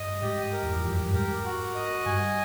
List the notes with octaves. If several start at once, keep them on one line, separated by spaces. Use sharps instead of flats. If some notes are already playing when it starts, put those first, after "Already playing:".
Already playing: G2 D#5
G#2 G4
A#4
E2
F2
F#2 G4
G2
G#2 A#4
F#4
D#5
G2 G#5